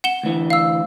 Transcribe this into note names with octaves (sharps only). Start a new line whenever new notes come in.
F#5 E7 G7
D2 E3
F5 E6